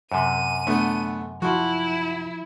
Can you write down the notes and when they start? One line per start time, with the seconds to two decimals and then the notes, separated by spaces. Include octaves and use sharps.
0.12 F#2 C3 D#7
0.67 D3 A3 B3
1.42 F3 E4 F#4 C6